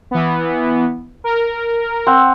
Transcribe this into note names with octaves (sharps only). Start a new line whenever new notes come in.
E3 B3
A#4
C4 F#5